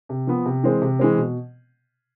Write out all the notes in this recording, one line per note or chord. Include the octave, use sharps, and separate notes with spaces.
C3
F3 B3
C3
E3 G#3 C4
C3
E3 G#3 C4
B2